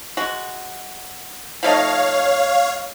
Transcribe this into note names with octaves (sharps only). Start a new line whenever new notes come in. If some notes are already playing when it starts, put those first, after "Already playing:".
G#3 F#4
F3 A3 D#4 C#5 F5